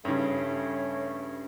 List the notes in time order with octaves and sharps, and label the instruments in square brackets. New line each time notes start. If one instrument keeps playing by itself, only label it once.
[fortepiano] G2 C#3 [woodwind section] A3 C#4 C#5